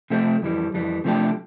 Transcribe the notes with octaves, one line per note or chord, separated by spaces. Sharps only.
C3 F3 A3 C4 G4
F2 E3 G3
F2 E3 G3
C3 F3 A3 D4 G4